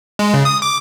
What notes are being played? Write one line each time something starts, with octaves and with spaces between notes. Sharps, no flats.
G#3
C#3
D#6
D6